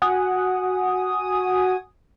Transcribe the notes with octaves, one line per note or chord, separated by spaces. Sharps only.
F#4 F#5 G#5 D#6